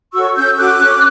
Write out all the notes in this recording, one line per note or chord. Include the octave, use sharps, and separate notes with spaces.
F#4 A4 C#5 C#6 E6
C#4 E6 G6
F#4 A4 D6 F#6
C#4